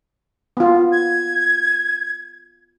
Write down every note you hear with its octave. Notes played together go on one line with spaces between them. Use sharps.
B3 F4
G#6